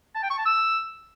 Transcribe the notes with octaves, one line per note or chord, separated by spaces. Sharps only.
A5
G5
C#6
A5
E6